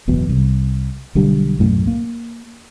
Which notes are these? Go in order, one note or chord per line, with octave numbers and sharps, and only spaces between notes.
F#1 E2 B2
C2
B1 D3 G3
B1 F#2 A2
A#3